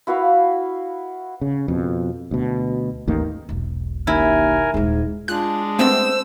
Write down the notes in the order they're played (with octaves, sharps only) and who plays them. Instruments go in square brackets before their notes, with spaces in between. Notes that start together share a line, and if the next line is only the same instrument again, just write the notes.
[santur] E4 F#4 B4 F5
[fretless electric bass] C#3
F2 B2
D2 B2
A1 D#2 D#3 A#3
[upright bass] E1 B1
[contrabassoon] D#2 [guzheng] E4 [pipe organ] A#4 G#5
[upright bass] D#1 G#3 [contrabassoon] G#2
[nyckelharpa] G#3 D4 [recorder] F4 [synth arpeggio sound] F#6
[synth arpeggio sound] A3 B3 C4 [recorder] C5 [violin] E6